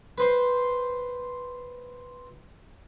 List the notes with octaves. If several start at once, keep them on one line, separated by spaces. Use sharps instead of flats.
B4 C5 C6